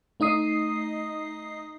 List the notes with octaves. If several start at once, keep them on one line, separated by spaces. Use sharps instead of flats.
A3 D#4 D#5 D#6 C7